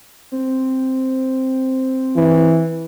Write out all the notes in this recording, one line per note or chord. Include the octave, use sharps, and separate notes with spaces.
C4
E3